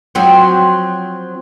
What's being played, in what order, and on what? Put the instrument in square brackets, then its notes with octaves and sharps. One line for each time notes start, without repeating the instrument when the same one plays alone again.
[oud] F3 F#3 C4